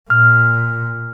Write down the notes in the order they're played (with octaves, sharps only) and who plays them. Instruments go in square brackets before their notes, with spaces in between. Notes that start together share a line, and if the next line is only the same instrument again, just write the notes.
[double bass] A#2 [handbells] F6